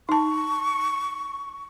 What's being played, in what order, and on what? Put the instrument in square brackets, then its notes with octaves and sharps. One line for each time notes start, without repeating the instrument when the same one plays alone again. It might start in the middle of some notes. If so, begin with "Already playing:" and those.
[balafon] D#4 A5 [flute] C#6